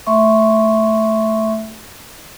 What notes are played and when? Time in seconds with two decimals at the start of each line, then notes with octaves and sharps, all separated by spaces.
0.07 A3 E5 C6 C#6